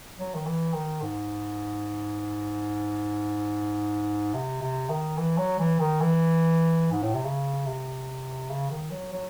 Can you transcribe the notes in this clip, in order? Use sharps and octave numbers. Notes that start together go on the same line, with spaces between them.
F#3
D#3
E3
D#3
G#2
C3
C3
D#3
E3
F#3
E3
D#3
E3
G#2
A2
C3
C#3
C3
C#3
D#3
F#3
F#3